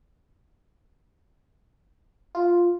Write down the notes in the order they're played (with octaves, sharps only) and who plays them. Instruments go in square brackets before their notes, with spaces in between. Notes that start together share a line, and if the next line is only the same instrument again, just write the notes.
[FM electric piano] F4